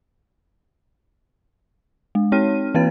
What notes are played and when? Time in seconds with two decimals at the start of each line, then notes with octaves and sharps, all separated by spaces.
2.15 G#3
2.32 C4 D#4 C#5 F6 D#7
2.74 E3 A#3 C4 B4 F5 A6